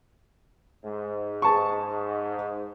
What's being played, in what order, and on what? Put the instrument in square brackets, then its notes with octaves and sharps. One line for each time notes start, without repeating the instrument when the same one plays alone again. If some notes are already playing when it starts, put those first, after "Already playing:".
[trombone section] G#2
[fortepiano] G#4 A5 C#6